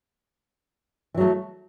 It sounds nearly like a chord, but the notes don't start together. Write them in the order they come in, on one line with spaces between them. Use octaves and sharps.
E3 F#3 A3